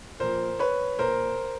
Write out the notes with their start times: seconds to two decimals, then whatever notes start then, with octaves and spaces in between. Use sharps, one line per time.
0.20 A#2 F3 A#4 C5
0.59 B4 C#5
0.99 A#2 A#4 C5